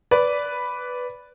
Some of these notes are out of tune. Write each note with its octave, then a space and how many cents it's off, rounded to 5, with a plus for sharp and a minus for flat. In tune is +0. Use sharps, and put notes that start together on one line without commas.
B4 +0 D5 -15